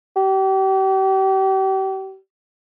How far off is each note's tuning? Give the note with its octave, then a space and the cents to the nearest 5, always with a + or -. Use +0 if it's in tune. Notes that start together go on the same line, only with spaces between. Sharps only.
G4 -35